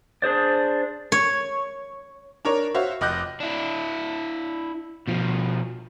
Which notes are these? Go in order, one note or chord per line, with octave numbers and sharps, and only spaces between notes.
D4 G#4 C5 D5
C#5
D4 A#4 C#5
F#4 C5 C#5 E5 F5
F1 D#5 D6 F#6 G6 A#6
D4 E4
B2 F3